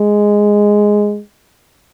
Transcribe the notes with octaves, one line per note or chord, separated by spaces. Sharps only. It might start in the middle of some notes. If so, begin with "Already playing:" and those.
Already playing: G#3